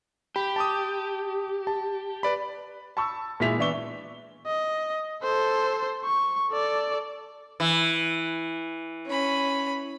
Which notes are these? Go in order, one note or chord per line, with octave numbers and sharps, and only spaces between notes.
G4 B5
A5 D6 D#6
A5
B4 D5 B5
A5 B5 C#6 E6
A#2 G#3 E4 B6 F7
E3 B3 D4 E5 C#6 G7
D#5
A4 C5
C#6
A4 D5
E3
C#4 B5